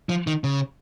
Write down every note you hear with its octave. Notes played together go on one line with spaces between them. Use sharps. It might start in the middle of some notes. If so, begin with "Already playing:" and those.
F3
D#3
C#3